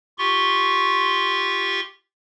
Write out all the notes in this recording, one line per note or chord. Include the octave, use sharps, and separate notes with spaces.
F4 G4 C6 C#6